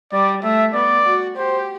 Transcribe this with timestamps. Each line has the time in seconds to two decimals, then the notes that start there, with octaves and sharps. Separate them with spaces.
0.12 G3 D5
0.44 A3 E5
0.74 B3 D5
1.06 F#4
1.36 G4 C5